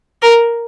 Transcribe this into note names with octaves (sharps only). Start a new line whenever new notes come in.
A#4